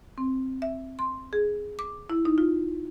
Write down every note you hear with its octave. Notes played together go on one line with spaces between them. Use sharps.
C4
E5
C6
G#4
D6
E4
D#4
F4